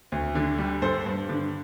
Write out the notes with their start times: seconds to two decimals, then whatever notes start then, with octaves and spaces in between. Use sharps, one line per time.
0.12 D2
0.35 D3
0.58 G3
0.82 G2 A4 C5
1.06 G2
1.29 D3